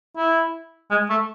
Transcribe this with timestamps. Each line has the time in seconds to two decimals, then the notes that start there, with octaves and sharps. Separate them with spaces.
0.16 E4
0.90 G#3
1.09 A3